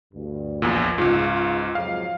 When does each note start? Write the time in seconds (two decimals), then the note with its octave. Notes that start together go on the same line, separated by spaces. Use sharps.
0.14 D2 G2
0.62 A#1 E2 A#2
0.98 C#2 G#2 F4
1.75 F2 G#2 F#3 F5